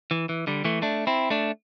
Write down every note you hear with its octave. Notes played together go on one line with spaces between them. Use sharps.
E3
E3
D3 G3
E3 A3
A3 D4
C4 E4
A3 D4